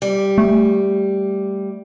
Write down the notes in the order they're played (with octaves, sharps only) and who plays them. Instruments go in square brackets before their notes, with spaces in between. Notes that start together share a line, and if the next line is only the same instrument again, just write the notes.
[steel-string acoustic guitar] G3
[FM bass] A3